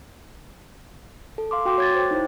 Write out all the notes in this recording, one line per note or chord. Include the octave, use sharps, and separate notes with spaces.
A4
F5 C6 D6
F#4 G5 C6 D6
C#5 G#6 A6
C5 G5
D#4 E4 C5